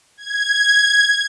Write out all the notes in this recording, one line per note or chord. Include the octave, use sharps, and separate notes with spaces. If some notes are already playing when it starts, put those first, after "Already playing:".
G#6